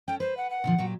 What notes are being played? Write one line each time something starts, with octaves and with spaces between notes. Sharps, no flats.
C#4 A4 G5
B4 C5
F#5
F#5
A#2 D3 F3
A#2 F#3 G4